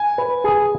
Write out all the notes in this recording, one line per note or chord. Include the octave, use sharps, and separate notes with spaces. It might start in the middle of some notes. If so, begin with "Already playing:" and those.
Already playing: G#5
B4
G#4